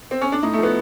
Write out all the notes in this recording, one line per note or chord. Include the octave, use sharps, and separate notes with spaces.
C4
C#4
D4
A2 D#4
A3
F3 B3